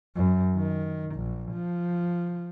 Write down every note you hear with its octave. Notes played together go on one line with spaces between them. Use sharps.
F#2
D#3
A#1
F3